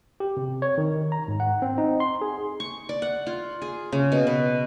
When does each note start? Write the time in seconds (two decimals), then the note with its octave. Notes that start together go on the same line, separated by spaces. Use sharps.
0.20 G4
0.37 C3
0.62 C#5
0.78 D#3
1.12 A#5
1.28 G#2
1.40 F#5
1.62 C4
1.78 D#4
2.00 C6
2.21 G#4
2.60 C#6
2.89 D5
3.02 F#5
3.27 F4
3.62 G#4
3.92 C#3
4.12 B2
4.27 B4